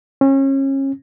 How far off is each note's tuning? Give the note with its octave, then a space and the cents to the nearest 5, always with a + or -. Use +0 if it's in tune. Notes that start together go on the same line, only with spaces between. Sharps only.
C#4 -30